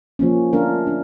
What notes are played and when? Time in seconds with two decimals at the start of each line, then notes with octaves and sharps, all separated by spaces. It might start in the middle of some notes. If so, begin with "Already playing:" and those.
0.19 F3 A#3 C#4
0.53 A3 D4 F4 A#4
0.87 D4